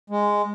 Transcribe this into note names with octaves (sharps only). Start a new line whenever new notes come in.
G#3